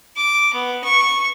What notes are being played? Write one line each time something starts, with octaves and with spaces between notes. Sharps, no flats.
D6
B3
C#6